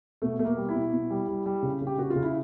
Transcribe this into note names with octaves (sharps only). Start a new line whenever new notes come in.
B2 A3
B2 A3
A#3
G3
E4
B2
B2
G3
G3
G3
C#3
C#3
G4
C#3 F#4
F4
C#3
E4